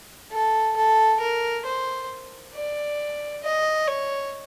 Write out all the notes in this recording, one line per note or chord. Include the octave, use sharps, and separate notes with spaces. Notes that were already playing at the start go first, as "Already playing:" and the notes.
A4
A4
A#4
C5
D5
D#5
C#5